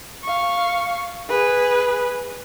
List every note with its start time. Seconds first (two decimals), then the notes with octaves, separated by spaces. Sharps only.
0.24 F5 C#6
1.29 G#4 B4